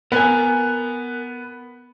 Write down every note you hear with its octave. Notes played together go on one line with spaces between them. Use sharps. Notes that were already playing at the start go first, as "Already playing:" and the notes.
B3 A#4 G#5